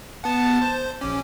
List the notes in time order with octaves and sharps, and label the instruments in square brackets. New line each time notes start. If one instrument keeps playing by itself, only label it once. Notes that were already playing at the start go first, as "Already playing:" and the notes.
[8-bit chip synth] B3 F#5 [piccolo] A5
[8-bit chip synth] C5
[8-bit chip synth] A#1 C#4 [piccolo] D6